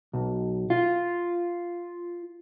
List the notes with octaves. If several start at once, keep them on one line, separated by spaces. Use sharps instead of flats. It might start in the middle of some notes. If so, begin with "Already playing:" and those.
B1
F4